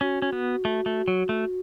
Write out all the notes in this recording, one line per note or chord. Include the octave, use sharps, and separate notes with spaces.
C#4 F#4
C#4
B3
A3
A3
F#3
A3